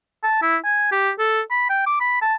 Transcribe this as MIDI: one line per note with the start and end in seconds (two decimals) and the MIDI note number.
0.23 0.40 81
0.42 0.57 64
0.64 0.88 80
0.92 1.11 67
1.19 1.41 69
1.50 1.67 83
1.69 1.82 79
1.86 1.95 86
2.00 2.17 83
2.21 2.35 81